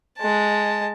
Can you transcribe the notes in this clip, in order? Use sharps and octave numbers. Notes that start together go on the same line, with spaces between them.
G#3 A5